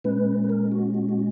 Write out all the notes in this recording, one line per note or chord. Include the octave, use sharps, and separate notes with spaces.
A#2 G#3 C#4 B4
B4
A#4
F#4
F#4
F#4